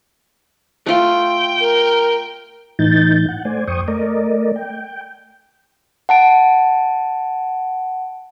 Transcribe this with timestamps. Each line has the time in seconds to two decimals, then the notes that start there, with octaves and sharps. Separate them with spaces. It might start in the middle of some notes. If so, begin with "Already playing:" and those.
0.86 A3 F4 G5
1.60 A#4
2.79 A2 E3 D#4 G6 A6
3.28 F#5
3.45 A3 C5 D5 G#5
3.67 F2 C5 G5 C#6 D#6
3.88 A3 A#4 D5 D#5
4.56 G5
6.09 F#5 A5 D7